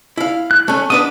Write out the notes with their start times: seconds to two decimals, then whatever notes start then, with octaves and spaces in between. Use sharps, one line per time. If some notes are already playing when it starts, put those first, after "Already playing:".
0.17 E4 F5
0.51 F#6
0.68 A3 C#4
0.90 B3 D4 B4 D#6